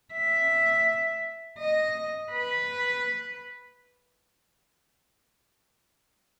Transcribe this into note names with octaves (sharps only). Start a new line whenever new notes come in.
E5
D#5
B4